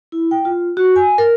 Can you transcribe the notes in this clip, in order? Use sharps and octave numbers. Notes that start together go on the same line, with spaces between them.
E4
G5
F4
F#4
G#5
A#4